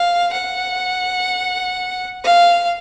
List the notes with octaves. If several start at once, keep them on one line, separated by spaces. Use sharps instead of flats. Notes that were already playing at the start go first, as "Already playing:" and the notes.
Already playing: F5
F#5
F5